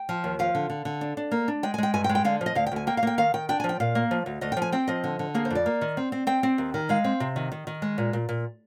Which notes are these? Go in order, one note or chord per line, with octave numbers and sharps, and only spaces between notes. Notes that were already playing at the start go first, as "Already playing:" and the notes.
Already playing: G5
F3
D#2
F3 F5
D3
D3
D3
D4
D4
A#3
D4
G#3 G5
G#5
G#3 G5
G2 G#5
G5
G#3
G5
D3 F5
F3
D#5
D2 F5
G5
D2 G#5
A#3 G5
F5
A#3 G5
D#3 F5
D#3 G5
D4 G5
G#5
F3
G5
A#2 F5
A#3
F3
D2
D2 D#5
G5
F3
G#5
C4 G5
F3 D#5
D3
D3
A#3 G#4
C5
F2 D5
A#3
D#3
C4
C4
C4 G5
C4
D#2
D#3
G#3 F5
C4
C3
D#3
D#3
D#3
G#3
A#2
A#2
A#2